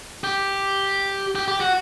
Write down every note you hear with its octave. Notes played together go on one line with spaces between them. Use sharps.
G4
G4
G4
F#4